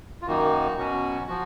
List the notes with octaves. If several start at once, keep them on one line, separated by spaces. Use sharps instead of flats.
F4
F#2 D#3 A#3 D#4 F#4
B2 F#3 C#4 F#4
F3 F#4